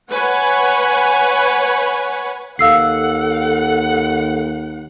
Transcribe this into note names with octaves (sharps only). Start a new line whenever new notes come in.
B4 C#5 F#5 G#5
D#2 A4 F5 F#5 E6 C7